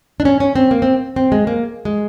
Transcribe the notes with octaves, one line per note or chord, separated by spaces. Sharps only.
D4
C#4
C#4
C4
A#3
C4
C4
G#3
A#3
G#3